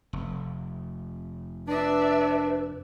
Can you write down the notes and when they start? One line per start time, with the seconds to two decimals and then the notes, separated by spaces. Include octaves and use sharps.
0.13 F1
1.68 D4 B4 D5 E5